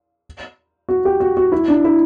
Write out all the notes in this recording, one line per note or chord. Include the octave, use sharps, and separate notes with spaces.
F#4
G4
F#4
F#4
E4
D4
E4